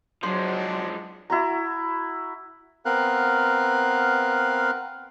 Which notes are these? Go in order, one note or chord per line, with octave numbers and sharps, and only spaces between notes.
F3 F#3 G#3 D4 C5
E4 F#4 A#5
B3 C4 A#4 F5 F#6